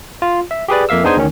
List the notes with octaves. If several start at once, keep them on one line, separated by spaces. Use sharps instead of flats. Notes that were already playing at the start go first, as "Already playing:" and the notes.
F4
E5
G4 G#4 B4 D5
F2 A#3 E5 F5 E6
B3 D4 D#4 G#4 C5 G#5
D2 D#3 C#4